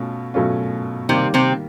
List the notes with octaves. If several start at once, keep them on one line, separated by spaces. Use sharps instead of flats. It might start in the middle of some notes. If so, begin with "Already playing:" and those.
Already playing: B2 A3 C#4 F4
B2 F#3 A3 C#4 F4
C3 D#3 G3 A#3 C4
C3 C4